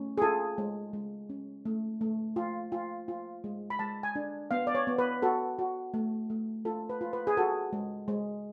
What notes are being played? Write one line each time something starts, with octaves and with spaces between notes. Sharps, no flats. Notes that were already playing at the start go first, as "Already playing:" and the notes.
Already playing: A3 C#4
G#4
F4 A4
G#3
G#3
C#4
A3
A3
F4
F4
F4
G#3
B5
G#3 A5
G#5
D4
B3 F5
D5
C#5
B3
B4
F#4 A4
F#4
A3
A3
F4 A4
B4
F4
B4
G#4
F#4 A4
G#3
G#3